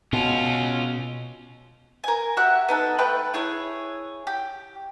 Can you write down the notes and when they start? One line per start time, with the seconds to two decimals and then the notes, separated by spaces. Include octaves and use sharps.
0.13 B2 C#4 F4
2.04 A#4 G#5
2.37 F#4 G4 E5 F#6
2.69 B3 D#4 A4
2.98 A3 B4 G5 F#6
3.34 E4 G#4 C#5
4.27 G4